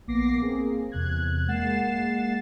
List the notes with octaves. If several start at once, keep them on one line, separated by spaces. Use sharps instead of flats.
A#1 A#3 B3 D6 A#6 C7
A#3 C4 G#4
E2 C3 F#6 G#6
G#3 A#3 F#5 A6 C7 E7